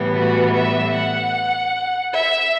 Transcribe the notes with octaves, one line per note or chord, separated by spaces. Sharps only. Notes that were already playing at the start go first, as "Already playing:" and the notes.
Already playing: A2 E3 G3 B3
F#4
E5
F#5
E5